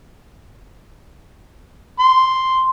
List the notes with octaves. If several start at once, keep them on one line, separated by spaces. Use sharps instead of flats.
C6